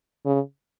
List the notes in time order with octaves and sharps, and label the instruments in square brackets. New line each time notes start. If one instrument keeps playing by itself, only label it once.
[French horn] C#3